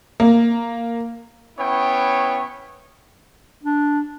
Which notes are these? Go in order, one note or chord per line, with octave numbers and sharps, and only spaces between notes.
A#3
B3 C#4 E4 C#5 G5
D4